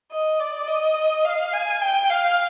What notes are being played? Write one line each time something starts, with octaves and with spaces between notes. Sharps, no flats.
D#5
D5
D#5
F5
G#5
G5
F5